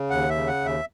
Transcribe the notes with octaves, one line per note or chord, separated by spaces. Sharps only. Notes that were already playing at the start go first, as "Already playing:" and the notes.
Already playing: C#3
D#2 F#5
E5
C#3
F#5
D#2
E5